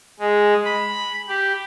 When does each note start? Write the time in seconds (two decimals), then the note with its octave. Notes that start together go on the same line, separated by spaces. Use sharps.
0.20 G#3
0.65 B5
1.28 G4